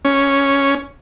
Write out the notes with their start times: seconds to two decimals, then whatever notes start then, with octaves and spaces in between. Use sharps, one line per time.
0.05 C#4